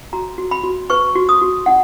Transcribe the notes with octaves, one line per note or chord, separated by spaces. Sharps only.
F#4 A#5
F#4
B5
F#4
B4 C#6
F#4
D#6
F#4
D#4 F#5